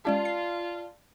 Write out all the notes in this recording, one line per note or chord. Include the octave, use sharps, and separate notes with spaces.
G#3 C#4 F4 G4 D5 A5
C7